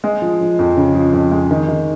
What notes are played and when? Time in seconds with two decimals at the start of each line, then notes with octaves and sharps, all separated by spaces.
0.04 G#3
0.22 F3
0.41 F3
0.59 F2
0.77 C#3
0.95 F3
1.13 F2
1.32 G#3
1.51 D#3
1.68 D#3